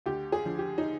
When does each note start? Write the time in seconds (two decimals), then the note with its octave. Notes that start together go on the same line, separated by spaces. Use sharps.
0.06 D2 G4
0.32 G#4
0.45 D3 F3
0.58 G4
0.78 D#4